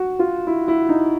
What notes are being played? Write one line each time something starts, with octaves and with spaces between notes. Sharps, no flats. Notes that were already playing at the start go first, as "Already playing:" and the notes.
Already playing: F#4
F4
E4
E4
D#4